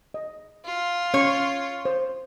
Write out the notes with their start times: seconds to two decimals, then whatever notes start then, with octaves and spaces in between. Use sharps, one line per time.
0.14 D#5
0.65 F4
1.14 C#4 C#5 C#6
1.85 C5